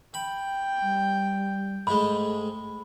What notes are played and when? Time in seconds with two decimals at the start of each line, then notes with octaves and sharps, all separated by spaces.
0.14 G5 B5
0.82 G3
1.87 G#2 G#3 A3 B5